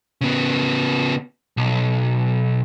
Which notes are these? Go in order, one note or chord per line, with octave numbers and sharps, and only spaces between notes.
C#3 B3
B1